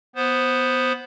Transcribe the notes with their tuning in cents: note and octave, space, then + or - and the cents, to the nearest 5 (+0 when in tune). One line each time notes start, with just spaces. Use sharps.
B3 +0 C5 +0